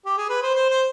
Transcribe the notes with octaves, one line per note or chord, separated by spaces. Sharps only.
G4
G#4
B4
C5
C5
C5